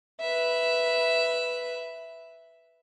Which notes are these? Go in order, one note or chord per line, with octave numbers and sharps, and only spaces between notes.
B4 E5